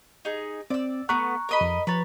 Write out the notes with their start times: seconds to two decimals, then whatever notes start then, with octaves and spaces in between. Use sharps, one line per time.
0.25 D#4 G#4
0.70 C4 D5 E6
1.09 A3 B3 A#5 C#6 F#6
1.49 A#4 D#5 B5
1.61 F2
1.87 F3 B4 C#5 A#5 A6